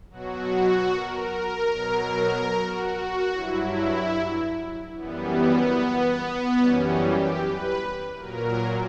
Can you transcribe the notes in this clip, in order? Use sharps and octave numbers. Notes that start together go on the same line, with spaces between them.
B2 F#3 F#4
A#4
B2 F#3
F#4
G2 F#3 E4
F#2 E3 G3 B3
F#2 E3 G3 C#4
G4
B4
A#2 F#3 A#4